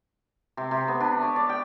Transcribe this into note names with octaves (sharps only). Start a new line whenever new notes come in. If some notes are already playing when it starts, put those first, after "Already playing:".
C3
C3
B3
D4
C#5
D5
G5